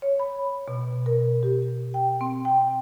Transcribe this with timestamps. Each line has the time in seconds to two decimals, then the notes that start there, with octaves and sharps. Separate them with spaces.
0.02 C#5
0.19 B5
0.68 B2
1.06 A#4
1.43 G4
1.94 G5
2.21 C4
2.45 G5